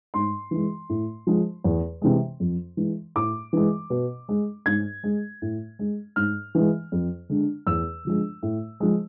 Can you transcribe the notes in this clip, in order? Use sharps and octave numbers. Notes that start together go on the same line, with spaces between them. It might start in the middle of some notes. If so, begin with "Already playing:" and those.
G#2 C6
E3 G#3
A2
F3 G#3
E2
C3 E3 G#3
F2
E3 G#3
A2 D6
E3 G#3
B2
G#3
G#2 G#6
G#3
A2
G#3
G#2 F6
E3 G#3
F2
D3 G#3
E2 E6
D3 F3 G#3
A2
F3 G#3